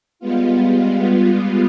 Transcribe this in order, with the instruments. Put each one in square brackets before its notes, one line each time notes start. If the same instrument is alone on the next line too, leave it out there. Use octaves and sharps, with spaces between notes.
[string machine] G3 G#3 B3 F4